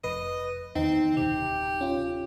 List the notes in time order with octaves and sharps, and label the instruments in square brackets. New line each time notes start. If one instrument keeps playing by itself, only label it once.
[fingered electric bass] F1 [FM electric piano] B4 [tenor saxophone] D#5
[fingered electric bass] E2 D#3 [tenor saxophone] C4 [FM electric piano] D#4
[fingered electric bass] D1 G#1 C3 [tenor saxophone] G4
[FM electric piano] C#4 F4